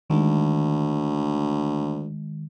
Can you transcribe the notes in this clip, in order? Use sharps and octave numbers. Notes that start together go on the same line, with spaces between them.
D2 D#3 G#3